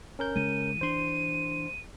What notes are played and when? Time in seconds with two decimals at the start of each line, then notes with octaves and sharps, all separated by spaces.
0.19 C#4 A#4 G6
0.36 C#3 G#3 D#7
0.81 E3 D4 C5 C6